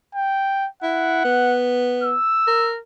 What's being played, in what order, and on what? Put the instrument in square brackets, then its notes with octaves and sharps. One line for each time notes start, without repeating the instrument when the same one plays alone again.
[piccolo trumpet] G5
[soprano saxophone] E4 [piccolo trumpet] F#5
[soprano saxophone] B3
[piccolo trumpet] E6
[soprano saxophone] A#4